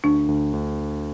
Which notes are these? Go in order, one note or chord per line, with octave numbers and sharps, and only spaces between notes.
D2 D4
D2
D2